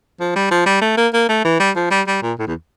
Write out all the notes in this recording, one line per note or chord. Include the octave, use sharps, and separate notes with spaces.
F3
G3
F3
G3
A3
A#3
A#3
A3
E3
G3
F3
G3
G3
A#2
A2
E2